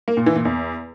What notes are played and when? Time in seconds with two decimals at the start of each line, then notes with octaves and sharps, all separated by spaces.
0.08 A#3
0.17 A#2
0.26 E3
0.36 A#2
0.45 E2